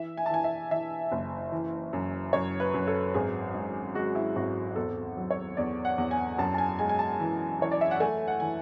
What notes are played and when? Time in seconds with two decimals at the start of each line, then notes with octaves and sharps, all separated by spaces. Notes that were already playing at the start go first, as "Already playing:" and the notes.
Already playing: E3 E5
0.17 G#5
0.26 A5
0.30 E3 G#5
0.44 E5
0.71 E3 E5
1.12 F#1
1.52 E3
1.93 F#2
2.33 F#2 C#5
2.60 B4
2.74 F#2
2.88 A4
3.14 G#1 G#4
3.54 G#2
3.95 G#3 F#4
4.15 E4
4.36 G#1 F#4
4.76 E2 A4
5.17 F#3
5.30 C#5
5.57 E2 D5
5.85 F#5
5.98 E2
6.11 G#5
6.38 F#2 A5
6.54 A5
6.58 G#5
6.79 G#3 G#5
6.89 G#5
6.99 A5
7.20 E3
7.59 E3 C#5
7.72 D5
7.81 E5
7.91 F#5
8.00 A3 G#5
8.28 F#5
8.40 E3 G#5